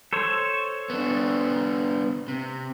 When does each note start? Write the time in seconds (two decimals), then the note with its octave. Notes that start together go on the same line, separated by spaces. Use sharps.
0.13 A4 C5 C#5
0.90 B3 D4
2.28 C3